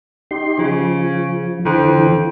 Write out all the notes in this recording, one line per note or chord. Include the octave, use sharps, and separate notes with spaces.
D#4 G4 C6
C#3 F3
F2 D3 E3